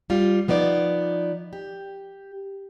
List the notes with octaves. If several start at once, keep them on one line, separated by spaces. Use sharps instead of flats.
G3 F4
F3 B3 D#4 D5
G4